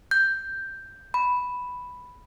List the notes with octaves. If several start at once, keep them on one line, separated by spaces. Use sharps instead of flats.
G6
B5